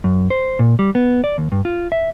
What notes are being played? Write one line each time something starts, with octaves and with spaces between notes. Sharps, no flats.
F#2
C5
A#2
G3
B3
D5
D#2
G2
F4
E5